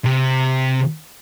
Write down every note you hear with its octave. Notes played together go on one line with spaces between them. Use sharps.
C3